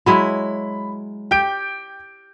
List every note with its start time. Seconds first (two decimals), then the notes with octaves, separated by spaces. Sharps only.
0.06 F#3 G#3 E4 B5
1.31 G4 G5 G6 D7